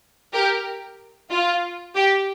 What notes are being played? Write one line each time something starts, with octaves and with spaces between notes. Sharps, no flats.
G4 A#4
F4
G4